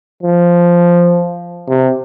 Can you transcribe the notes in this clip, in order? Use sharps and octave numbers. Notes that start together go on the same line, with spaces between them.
F3
C3